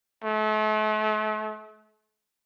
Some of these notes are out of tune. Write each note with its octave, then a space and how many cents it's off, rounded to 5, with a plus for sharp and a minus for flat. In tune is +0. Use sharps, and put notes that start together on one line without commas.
A3 -40